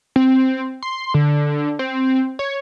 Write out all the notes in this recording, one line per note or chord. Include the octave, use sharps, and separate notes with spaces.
C4
C6
D3
C4
C#5